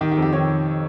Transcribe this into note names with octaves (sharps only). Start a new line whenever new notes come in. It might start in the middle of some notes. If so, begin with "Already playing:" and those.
D#3 G4
G4
F2
G4
D#3 C#5